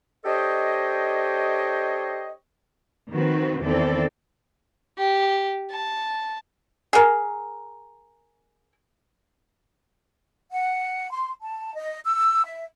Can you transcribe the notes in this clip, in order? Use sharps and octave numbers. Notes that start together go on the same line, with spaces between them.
D4 G4 A4 C5 C#5 D#5
D#3 F3 C4 F#4 B4
E2 D#3 E3 C4 A4 D5
G4
A5
G#4 A#4
F#5
C6
A5
D#5
E6
E5